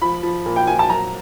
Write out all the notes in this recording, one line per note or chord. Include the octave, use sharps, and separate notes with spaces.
F3 B5
F3
A#2
G5
F3 G#5
A5
F#3 A#5